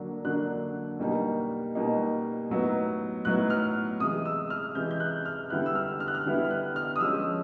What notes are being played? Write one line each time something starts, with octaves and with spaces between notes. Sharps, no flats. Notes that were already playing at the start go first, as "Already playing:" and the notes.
Already playing: D3 F#3 A#3 D4
D3 F#3 A#3 D4 F#6
B2 G3 A#3 D#4
B2 G3 A#3 D#4
A2 F#3 B3 D#4
A2 F#3 B3 D#4 F#6
F6
C3 E3 G#3 D#6
E6
F6
C3 E3 G#3 G6
G6
F#6
F6
D3 G3 B3 E4 F#6
E6
F6
F6
F#6
F6
D3 G3 B3 E4
F6
F#6
F6
D#6
F3 G#3 C#4 E6